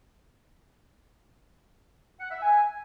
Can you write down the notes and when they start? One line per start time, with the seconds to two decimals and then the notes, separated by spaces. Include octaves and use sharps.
2.20 F#5
2.31 E5
2.42 G#5